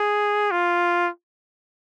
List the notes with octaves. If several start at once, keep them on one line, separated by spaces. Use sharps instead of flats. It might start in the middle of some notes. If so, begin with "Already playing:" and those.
Already playing: G#4
F4